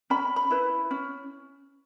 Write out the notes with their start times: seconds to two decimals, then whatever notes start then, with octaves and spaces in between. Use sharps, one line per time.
0.10 C#4 B5
0.36 B5
0.51 E4 B4
0.91 C#4